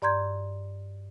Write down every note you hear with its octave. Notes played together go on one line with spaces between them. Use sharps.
G2 D5 A#5 C6 G6 G#6